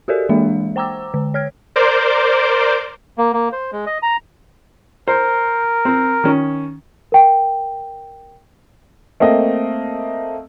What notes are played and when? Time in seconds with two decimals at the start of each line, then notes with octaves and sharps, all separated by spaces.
0.08 F#4 G4 A4 A#4 D5
0.29 E3 G#3 A#3 D4 E5
0.76 C5 G5 A#5 D6 E6
1.14 D3
1.34 C#5 F6 G#6
1.76 A#4 C5 D5 D6 G6
3.18 A#3
3.33 A#3
3.52 C5
3.72 G#3
3.86 D#5
4.02 A#5
5.08 A#4 C5
5.85 C4
6.24 D#3 C#4
7.12 A#4 G5
9.20 A3 A#3 C4 D#5